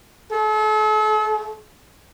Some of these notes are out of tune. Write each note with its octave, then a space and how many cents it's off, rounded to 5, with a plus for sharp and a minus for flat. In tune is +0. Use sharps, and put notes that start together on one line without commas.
A4 -40